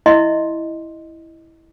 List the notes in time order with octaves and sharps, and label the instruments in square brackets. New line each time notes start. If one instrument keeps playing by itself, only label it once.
[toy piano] E4 D#5 E5 C6